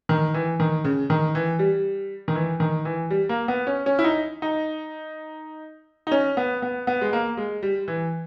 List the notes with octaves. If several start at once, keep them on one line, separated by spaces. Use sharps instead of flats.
D#3
E3
D#3
C#3
D#3
E3
G3
D#3
E3
D#3
E3
G3
A#3
B3
C#4
C#4
E4
D#4
D#4
D#4
C#4
B3
B3
B3
G#3
A#3
G#3
G3
E3